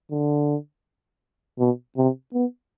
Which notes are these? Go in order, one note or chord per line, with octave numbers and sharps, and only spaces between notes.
D3
B2
C3
B3